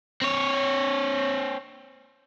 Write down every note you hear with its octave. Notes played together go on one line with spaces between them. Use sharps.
C4 C#5